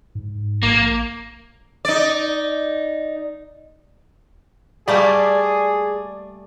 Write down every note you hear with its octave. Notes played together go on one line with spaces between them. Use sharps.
G#2
A#1 A#3
D#4 D5
G3 A3 A#3 G#4 D5